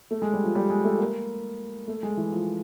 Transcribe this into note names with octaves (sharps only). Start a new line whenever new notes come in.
A3
G#3
G3
F3
G3
G#3
A3
A#3
A3
G#3
E3
F3